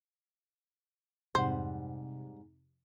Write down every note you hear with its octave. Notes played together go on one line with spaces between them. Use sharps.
F2 G#2 C3 G3 C5 F#5